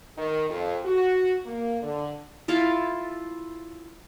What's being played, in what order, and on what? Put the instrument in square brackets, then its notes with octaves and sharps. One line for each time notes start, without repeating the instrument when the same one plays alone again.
[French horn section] D#3
F2
F#4
A#3
D3
[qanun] E4 F4 A4 F5